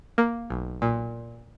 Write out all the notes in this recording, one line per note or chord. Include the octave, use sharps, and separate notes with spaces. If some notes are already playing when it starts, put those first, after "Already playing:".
A#3
B1
A#2